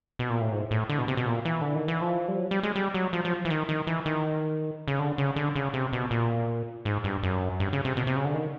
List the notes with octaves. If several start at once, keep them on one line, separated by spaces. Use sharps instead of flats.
B2
A#2
A2
G#2
A2
D3
B2
C3
B2
A#2
E3
D3
D#3
E3
F3
G3
F#3
G3
G#3
G3
F#3
F3
F3
E3
D#3
D#3
E3
D#3
C#3
D3
C#3
D3
C#3
C3
B2
A#2
G#2
G2
F#2
G2
C#3
C3
B2
C3
C#3
D3
D#3